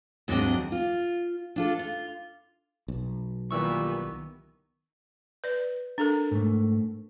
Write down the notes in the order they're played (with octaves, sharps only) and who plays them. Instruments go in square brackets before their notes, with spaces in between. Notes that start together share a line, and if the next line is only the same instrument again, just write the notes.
[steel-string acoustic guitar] D#2 G#2 F#3 C4 D4 D#5
F4
D4 F4 A4
F4
[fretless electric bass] B1
[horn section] A#2 E3 G3 [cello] D#3 B3 [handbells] C#6 E6
[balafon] B4 D5
D4 A4 A#4
[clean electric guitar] G#2 A3